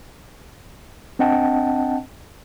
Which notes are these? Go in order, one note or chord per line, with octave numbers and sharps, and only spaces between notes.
C4 D4 D#5 F#5 G5 A5